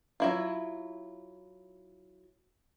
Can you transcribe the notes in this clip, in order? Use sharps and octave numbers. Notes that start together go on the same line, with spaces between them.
F#3 E4 F4